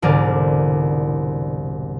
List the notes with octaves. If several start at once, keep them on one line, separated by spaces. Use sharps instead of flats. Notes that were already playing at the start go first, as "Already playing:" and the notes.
E1 C2 G#2 D3 A#4 D5